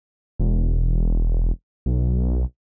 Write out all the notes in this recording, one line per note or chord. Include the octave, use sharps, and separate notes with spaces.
E1
B1